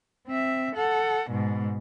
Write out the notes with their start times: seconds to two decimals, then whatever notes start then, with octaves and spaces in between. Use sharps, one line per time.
0.27 C4 E5
0.75 A4 F#5
1.30 G#2 B2